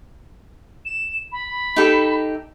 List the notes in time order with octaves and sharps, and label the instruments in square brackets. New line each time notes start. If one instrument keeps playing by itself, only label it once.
[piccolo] E7
B5
[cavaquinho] D#4 G4 A4